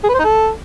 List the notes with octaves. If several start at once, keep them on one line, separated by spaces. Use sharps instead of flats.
G#4
B4
C5
D#4
A4